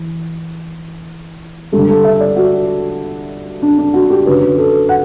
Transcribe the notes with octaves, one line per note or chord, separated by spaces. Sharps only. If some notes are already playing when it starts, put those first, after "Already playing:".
Already playing: E3
G2 D3 A4
A4
E5
D5
F#4
D4
D4
F#4
G4
F#2 D3 B4
A4
F#5